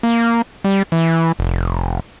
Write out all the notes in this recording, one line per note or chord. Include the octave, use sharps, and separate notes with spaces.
A#3
G3
E3
F1